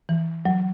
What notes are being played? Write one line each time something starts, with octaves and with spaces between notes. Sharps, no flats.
E3
F#3